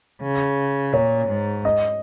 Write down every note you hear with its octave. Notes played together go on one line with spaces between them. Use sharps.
C#3
A#2 C#5
G#2
D#5